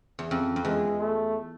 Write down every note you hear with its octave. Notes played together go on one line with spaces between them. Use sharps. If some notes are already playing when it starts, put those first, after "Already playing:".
E2
F2
F2
E2 G#3
A3